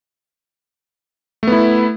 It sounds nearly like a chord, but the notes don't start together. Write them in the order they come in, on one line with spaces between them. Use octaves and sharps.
A3 B3 E4